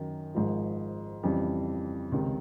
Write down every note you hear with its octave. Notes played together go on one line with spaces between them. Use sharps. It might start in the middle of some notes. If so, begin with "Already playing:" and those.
Already playing: F#2 D#3 F#3
G#1 G#2 F3
F2 C#3 E3 G3
C#2 C3 D#3